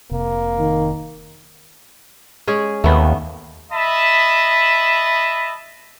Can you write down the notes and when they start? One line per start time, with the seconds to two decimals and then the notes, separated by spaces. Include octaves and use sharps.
0.11 F1 C3 A#3
0.59 D#3
2.47 G#3 C#4 G#4
2.84 D#2 A3 B3
3.72 D#5 E5 A5 B5